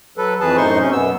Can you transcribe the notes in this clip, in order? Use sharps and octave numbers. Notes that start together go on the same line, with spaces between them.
F#3 A4 B4
F2 E3 G#4 B4 A5
F#2 A2 D#4 C5 C6 C#6
C3 C#4
F#2 B2 B3 E6